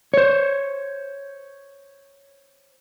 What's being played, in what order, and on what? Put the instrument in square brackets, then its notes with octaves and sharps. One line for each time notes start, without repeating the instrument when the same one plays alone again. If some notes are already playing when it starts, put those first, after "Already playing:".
[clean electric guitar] C5 C#5